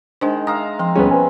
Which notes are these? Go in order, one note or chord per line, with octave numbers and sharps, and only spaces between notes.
D#3 G#3 D4 C5
E5 F5 A#5 D#6
F3 C4
D2 G3 B3 C#4 G#4
B4 C5 G#5